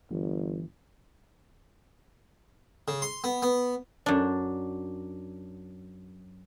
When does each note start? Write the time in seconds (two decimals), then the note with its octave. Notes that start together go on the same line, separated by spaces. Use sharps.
0.11 G1 E3
2.88 C#3
3.02 C6
3.24 B3
3.43 B3
4.06 F#2 D4